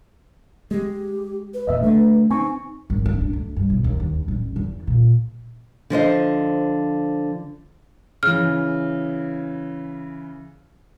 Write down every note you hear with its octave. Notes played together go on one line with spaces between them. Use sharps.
G#3 G4
B4
E1 E2 A#2 D#5 E5
D3 A3 B4
C4 D#4 G#5 C#6
G#1
D4
D4
D2
G2
B1
D#2
D#2
A1
E2
A#2
D3 F3 C5 D#5
C#3 E3 F6